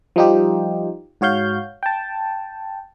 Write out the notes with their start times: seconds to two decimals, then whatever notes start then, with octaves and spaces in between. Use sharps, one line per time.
0.16 F3 G3 D#4 F4 G4
1.21 G#2 F#4 C#5 F5 G6
1.83 G5 A5